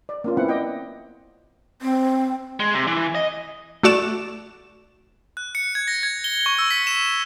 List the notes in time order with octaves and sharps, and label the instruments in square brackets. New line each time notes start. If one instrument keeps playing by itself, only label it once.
[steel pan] D5
A#3 C#4 F4
B3 C4 E4 F#5
D5 D#5 G5
[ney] C4
[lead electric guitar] G#3
C3
E3
D#5
[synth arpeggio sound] A3 F#4 D5 E7
[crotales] F#6
C#7
G#6
A#6
G#6
G7
C#6
E6
B6
E7